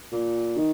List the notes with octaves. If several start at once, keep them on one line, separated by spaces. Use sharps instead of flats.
A#2
D#3